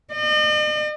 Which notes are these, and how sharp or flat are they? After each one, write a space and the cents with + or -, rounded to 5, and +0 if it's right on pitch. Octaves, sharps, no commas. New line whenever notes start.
D#5 -45